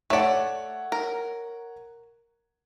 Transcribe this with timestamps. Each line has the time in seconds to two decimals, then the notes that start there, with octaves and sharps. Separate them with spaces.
0.10 A3 C#5 D5 F#5
0.92 A#4